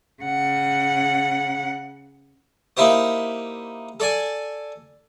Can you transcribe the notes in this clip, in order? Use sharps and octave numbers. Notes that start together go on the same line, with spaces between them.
C#3 F#5
A#3 D#4 E4 G4 C5
A4 D5 G#5